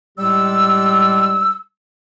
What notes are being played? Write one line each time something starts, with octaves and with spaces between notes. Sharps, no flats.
A2 G3 G#3 G4 E6